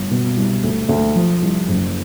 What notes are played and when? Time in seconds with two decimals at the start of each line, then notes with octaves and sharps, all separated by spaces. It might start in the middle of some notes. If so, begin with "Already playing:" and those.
Already playing: G1
0.11 B2
0.37 C2
0.64 D2
0.89 D2
1.15 F3
1.42 C2
1.69 F#1